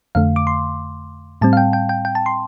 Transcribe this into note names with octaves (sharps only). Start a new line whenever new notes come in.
F2 D3 A3 F5
D6
C6
A2 G3 C4 A5
F5
G5
G5
G5
G5
A5
C6